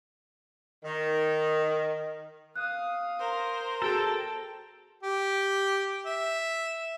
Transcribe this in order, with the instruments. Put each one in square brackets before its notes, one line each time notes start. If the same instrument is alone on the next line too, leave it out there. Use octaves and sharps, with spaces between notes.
[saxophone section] D#3
[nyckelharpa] F5 D#6 [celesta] F#6
[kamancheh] A#4 C5
[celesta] F#4 G#4 [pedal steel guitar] A4 [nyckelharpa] G5 A5
[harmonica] G4
E5